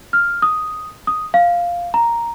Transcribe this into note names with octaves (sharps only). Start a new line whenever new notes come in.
F6
D#6
D#6
F5
A#5